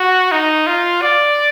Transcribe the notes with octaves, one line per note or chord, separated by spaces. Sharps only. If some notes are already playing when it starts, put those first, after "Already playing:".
Already playing: F#4
D#4
F4
D5